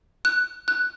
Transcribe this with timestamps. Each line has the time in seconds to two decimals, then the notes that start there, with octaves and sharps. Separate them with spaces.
0.25 F#6
0.68 F#6